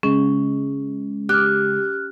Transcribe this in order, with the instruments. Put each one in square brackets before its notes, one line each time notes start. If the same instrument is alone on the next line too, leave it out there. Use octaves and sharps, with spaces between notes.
[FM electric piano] C#3 G#3 [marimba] C#4
[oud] G4 [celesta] F6 F#6